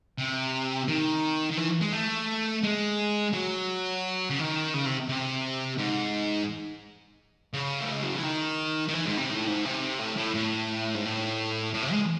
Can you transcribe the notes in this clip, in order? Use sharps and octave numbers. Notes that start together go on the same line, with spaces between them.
C3
D#3
D#3
E3
G#3
A3
G#3
F#3
C#3
D#3
C#3
C3
C3
G#2
C#3
A3
G#3
F#3
E3
D#3
D#3
E3
G#2
C3
A2
G#2
C3
A2
A2
A2
G#2
A2
A2
C3
G#3